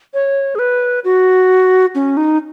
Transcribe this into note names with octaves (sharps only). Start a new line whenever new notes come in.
C#5
G#4
B4
F#4
C#4
D#4